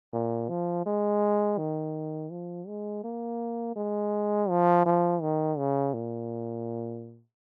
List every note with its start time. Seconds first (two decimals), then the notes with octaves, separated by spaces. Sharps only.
0.13 A#2
0.49 F3
0.86 G#3
1.58 D#3
2.31 F3
2.68 G#3
3.04 A#3
3.76 G#3
4.50 F3
4.86 F3
5.22 D#3
5.58 C#3
5.94 A#2